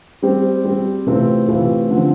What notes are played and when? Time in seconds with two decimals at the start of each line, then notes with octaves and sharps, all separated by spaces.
0.22 G3 C4 G4 C5
0.64 G3 C4 G4 C5
1.07 C3 E3 A3 C4 F4
1.48 C3 E3 A3 C4 F4
1.91 D3 F3 C4